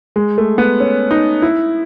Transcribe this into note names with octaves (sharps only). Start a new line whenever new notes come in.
G#3
A3
B3
C#4
D#4
E4